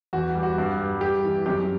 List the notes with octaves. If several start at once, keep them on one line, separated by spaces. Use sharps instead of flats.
E2 F#4
G3
F#4
G2
G3
G3 G4
E3
F#2 G4